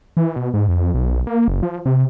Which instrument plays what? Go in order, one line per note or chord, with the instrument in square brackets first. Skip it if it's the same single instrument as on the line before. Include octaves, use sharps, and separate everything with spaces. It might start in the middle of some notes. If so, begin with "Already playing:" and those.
[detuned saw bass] E3
B2
G#2
F2
B1
A#3
F#1
F3
C3